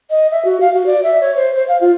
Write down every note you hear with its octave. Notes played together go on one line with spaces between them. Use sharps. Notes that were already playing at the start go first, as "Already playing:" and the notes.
D#5
E5
F#4
F5
F#4
D5
E5
C#5
C5
C5
F5
F4